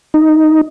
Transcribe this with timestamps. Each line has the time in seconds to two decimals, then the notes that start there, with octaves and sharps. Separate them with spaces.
0.14 D#4